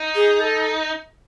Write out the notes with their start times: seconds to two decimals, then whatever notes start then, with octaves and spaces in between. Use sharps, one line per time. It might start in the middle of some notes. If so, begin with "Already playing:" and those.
Already playing: D#4
0.15 G#4
0.40 A4